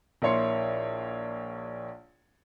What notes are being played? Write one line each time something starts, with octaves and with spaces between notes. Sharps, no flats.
A#1 A#3 E4 C#5 C6 C#7